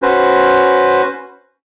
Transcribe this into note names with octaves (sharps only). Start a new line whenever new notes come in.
C#4 F#4 B4 C5